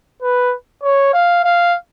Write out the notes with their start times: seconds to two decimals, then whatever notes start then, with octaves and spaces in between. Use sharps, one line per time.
0.22 B4
0.83 C#5
1.13 F5
1.44 F5